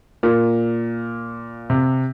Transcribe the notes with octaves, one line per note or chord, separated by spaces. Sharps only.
A#2
C3